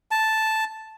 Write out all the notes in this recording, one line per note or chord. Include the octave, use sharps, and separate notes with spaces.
A5